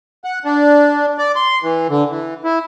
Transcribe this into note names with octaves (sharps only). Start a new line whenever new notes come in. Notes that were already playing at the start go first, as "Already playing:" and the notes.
F#5
D4
D5
C6
E3
D3
E3
E4